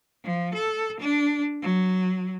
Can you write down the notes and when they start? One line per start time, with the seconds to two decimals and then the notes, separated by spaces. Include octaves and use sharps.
0.24 F3
0.54 A4
1.00 D4
1.62 F#3